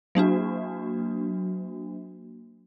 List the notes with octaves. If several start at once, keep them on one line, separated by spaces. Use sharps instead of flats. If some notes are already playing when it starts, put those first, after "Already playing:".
F#3 A#3 D4 F#4